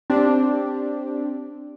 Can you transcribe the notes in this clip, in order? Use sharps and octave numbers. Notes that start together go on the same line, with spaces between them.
C4 D4 G4